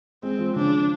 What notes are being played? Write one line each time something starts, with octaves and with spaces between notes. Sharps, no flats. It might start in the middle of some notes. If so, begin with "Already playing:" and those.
G#3 C4
F3
C#3 D4